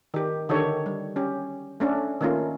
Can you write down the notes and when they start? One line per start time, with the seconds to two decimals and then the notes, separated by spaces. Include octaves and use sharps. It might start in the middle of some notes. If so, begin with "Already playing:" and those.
0.14 D#3 G4
0.49 D3 D#3 G4 A4 C#5
0.86 G3
1.16 C#4 G4
1.80 A3 C#4 D4 A4
2.21 D#3 A3 A#3 C#4 F4